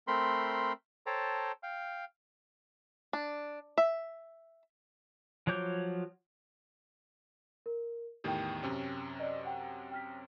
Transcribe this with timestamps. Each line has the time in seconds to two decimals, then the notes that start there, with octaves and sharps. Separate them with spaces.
0.08 A3 C4 A#4 B5 C6
1.06 A4 C5 C#5 G5 A5 A#5
1.63 F5 G5
3.13 D4
3.78 E5
5.47 F3 F#3 C#5 D6 G6
7.66 A#4
8.24 E2 A2 D#3 G4 G5
8.63 F#2 C3 C#4
9.20 D5 D#5
9.45 F#5 G5
9.91 G5 F6 B6